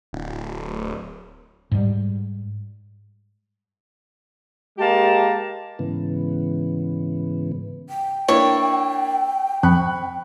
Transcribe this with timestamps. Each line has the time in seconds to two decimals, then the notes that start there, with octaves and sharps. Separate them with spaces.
0.13 D1
1.72 G#2 G3
4.78 G#3 A#3 G4 A5
5.79 G#2 C#3 E3 B3
7.89 G5
8.28 A#3 D4 E4 C#5
9.63 F2 B5 C#6 F#6